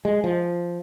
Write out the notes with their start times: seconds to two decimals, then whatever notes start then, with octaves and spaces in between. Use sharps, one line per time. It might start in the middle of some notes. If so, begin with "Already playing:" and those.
0.05 G#3
0.24 F3